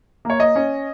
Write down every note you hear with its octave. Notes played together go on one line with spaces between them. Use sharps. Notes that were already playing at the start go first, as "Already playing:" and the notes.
A#3 C#5
D#5
C#4